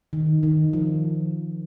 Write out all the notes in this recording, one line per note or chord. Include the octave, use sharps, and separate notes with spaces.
D#3
D#3
F3